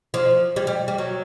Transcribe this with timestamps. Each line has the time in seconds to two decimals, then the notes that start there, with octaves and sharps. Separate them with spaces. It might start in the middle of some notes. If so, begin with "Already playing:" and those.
0.14 F3
0.56 G3
0.67 G3
0.88 G3
0.98 F#3